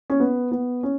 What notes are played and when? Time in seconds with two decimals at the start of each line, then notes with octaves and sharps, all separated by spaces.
0.10 C#4
0.20 B3
0.51 B3
0.83 C#4